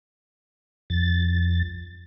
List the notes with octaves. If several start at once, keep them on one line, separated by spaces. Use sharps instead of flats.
F2 A6